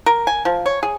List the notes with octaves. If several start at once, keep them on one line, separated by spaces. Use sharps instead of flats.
A#4
G#5
F3
C#5
G#4